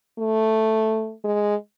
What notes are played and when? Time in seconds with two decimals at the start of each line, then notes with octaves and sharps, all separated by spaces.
0.19 A3
1.24 G#3